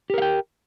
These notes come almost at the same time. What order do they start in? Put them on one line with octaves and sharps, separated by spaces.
G4 A#4 F5 G5